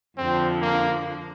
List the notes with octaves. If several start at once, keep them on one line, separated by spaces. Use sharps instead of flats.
F2 D3 F3 C4
A#3